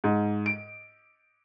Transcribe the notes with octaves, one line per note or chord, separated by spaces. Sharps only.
G#2
D7